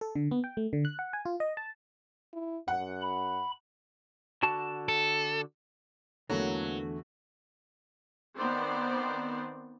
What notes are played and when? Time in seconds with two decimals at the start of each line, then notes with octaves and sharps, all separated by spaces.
0.01 A4
0.16 D3
0.31 B3
0.44 G5
0.57 A3
0.73 D3
0.85 F#6
0.99 F#5
1.13 G#5
1.25 F4
1.40 D#5
1.57 A5
2.33 E4
2.68 F#2 F#5
3.02 B5
4.43 D3 F#4 A5
4.88 A4
6.30 E2 D3 E3 F#3 A3 A#3
8.38 D#3 B3 C4 C5 D5